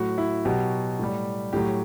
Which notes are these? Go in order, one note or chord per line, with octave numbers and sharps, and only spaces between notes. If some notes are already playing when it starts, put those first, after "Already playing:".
Already playing: A2 F#3 F#4
E4
B2 F#3 G4
A2 G3
A2 F#3 G4